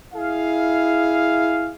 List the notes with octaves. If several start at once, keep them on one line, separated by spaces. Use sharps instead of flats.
E4 G#4 F5